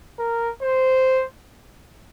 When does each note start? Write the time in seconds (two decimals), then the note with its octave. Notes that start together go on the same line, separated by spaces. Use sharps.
0.19 A#4
0.62 C5